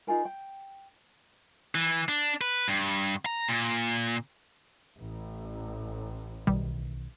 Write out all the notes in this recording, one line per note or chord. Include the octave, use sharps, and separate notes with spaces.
D#4 F4 G#4 A#4
G5
E3
D4
B4
G2
A#5
A#2
A1
B1 B2 D#3 G3